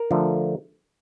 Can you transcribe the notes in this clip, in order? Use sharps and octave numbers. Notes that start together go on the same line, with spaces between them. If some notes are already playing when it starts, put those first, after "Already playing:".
Already playing: A#4
D3 F3 A3